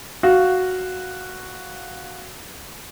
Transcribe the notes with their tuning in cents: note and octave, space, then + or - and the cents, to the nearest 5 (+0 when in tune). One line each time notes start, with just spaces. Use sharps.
F#4 +0 F5 +0